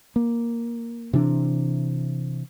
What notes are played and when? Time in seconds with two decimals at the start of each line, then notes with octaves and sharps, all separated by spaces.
0.16 A#3
1.13 C3 E3 D4